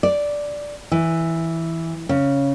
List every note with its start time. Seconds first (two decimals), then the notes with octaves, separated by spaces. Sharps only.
0.03 D5
0.92 E3
2.09 C#3